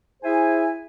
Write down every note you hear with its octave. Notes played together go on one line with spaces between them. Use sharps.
E4 G#4 C5 E5 G#5